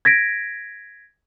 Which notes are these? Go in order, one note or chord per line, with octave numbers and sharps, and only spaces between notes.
G#6 A#6 B6 D7